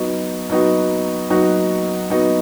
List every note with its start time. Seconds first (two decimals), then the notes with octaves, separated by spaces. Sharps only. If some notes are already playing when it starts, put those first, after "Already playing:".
Already playing: F#3 B3 D#4 F#4
0.50 F#3 B3 D#4 F#4
1.30 F#3 B3 D#4 F#4
2.10 F#3 B3 D#4 F#4